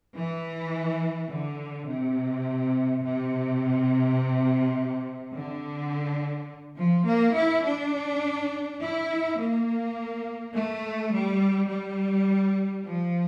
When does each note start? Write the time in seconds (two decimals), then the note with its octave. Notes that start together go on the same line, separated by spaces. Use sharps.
0.16 E3
1.30 D3
1.88 C3
3.03 C3
5.35 D3
6.79 F3
7.08 A#3
7.37 E4
7.66 D4
8.81 E4
9.39 A#3
10.54 A3
11.13 G3
11.69 G3
12.86 F3